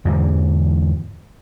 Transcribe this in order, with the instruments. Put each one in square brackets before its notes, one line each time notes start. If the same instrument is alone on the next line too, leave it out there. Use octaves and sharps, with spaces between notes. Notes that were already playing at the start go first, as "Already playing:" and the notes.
[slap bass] E2 G#2 D3 E3